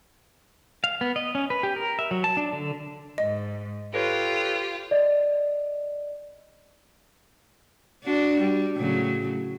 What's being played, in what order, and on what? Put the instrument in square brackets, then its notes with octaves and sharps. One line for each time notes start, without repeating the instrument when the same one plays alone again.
[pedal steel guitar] F5
B3
D#5
C#4
B4
G4
A#4
E5
F#3
A5
D4
D3
[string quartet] G#2 [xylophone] D#5
[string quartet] F4 G4 [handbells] A4 B4 C#5
[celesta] D5 D#5
[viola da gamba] D4 F#4
G3
A2 C#3 F#3